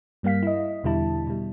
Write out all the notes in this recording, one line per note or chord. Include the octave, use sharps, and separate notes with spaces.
G2 G3 A#3 F5 B6
E4 D#5
E2 B2 D3 G3 E4 A5
B2 G3